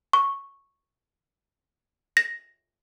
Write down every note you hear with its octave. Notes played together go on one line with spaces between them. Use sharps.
C#6
A#6